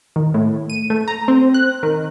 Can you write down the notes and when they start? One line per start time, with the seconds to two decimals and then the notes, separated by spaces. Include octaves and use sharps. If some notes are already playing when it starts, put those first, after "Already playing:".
0.16 D#3
0.34 A2
0.70 D#7
0.90 A3
1.08 A#5
1.28 C4
1.54 F#6
1.83 D#3